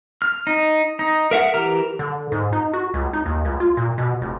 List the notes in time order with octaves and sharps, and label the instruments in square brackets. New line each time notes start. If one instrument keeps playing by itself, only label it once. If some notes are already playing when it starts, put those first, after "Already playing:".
[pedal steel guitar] F6
D#4
D#4
A#4 E5 F#5
E3 G4 A#4 A#5 F6
[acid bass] D3
G#2
D#4
F#4
C#2
D#4
D#2
C#2
F4
A#2
B2
F1